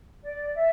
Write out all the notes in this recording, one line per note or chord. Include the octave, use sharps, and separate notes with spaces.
D5
E5